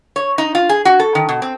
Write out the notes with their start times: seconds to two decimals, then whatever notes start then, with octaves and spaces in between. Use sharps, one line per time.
0.16 C#5
0.38 D#4
0.55 F4
0.69 G#4
0.85 F#4
1.00 A4
1.15 D#3
1.29 B2
1.42 C4